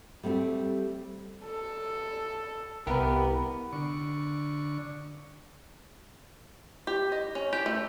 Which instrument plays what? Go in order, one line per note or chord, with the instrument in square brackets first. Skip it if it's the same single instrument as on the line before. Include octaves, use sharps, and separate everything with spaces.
[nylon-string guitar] G3 A3 C4 F4 G4
[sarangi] A4
[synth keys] C2 G4 A#4 [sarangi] B3
[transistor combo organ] D3 C#6
[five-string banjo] G4
D#5
C#4
G4
A3